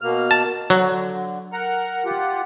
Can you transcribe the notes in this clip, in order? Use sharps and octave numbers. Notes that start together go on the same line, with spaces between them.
B2 A#3 F6
A5
D3 F#3
A#4 F#5 A#5
F4 G4 F#5